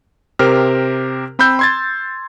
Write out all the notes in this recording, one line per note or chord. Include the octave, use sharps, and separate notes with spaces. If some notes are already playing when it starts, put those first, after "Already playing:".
C3 G4 A#4 C5 F6
C4 B5 E6 G6
C6 G#6 A6